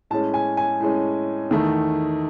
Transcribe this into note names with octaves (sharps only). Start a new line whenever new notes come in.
A2 G#3 C#4 A5
G#5
G#5
A2 G#3 C#4
E2 D#3 A3